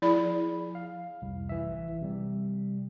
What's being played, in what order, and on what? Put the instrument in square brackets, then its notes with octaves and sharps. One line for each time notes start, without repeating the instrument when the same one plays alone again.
[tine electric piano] F3 G#4 [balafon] E4 D5 B5
[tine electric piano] F5
C2 F2
A1 E3 E5
C3 G3